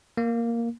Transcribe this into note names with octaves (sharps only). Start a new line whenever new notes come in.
A#3